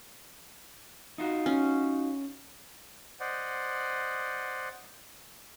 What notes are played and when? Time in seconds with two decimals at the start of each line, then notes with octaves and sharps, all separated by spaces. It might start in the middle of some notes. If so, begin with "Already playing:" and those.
1.18 D#4 F4 F#4
1.46 C#4
3.20 C5 D5 D#5 F#5